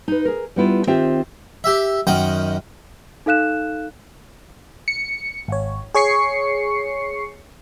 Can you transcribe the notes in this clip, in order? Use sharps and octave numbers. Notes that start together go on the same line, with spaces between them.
D#4 B4
G#4 A#4
G3 B3 E4 F4
D#3 C4 F4 G4 C5 E5
G4 E5
F#2 D#3 F#5 G5
D#4 A4 F5 F#6 E7
C#7
G#1 C#5
G#4 C#5 C#6 C7 C#7